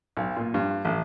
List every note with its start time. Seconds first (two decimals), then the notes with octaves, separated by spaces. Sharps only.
0.17 B1
0.37 A#2
0.54 G2
0.85 A1